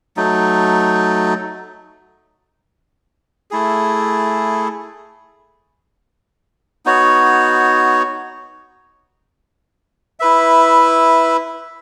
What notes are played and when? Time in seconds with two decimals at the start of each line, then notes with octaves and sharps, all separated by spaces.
0.17 F#3 A3 D#4
3.51 A3 E4 G#4
6.86 B3 D#4 F#4 C#5
10.20 E4 B4 E5